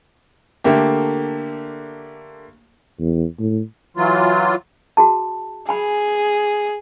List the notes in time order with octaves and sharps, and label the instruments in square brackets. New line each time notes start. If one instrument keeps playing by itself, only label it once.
[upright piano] D3 A3 A#3 G4
[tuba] E2
A2
[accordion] E3 F#3 F4
[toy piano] F#4 G#4 A5
[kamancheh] G#4 [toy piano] G#5 B5